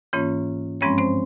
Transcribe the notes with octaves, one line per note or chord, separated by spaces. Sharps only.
G#2 E3 A#3 C#4 F4 C#5
G2 F3 G#3 C4 C#4 C#5
C4 C5